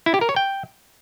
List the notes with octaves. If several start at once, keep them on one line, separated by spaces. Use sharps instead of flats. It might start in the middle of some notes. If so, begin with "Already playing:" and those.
E4
G4
A#4
C#5
G5